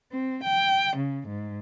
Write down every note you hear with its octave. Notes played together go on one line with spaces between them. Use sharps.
C4
G5
C#3
G#2